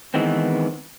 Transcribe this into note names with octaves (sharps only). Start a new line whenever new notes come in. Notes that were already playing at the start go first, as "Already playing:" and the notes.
D#3 E3 G#3 B3 C4